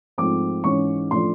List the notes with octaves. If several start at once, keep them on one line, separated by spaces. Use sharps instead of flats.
G#2 F3 A3 C4 D6
G#2 E3 G#3 C#4 C#6
A2 F3 A3 D4 C6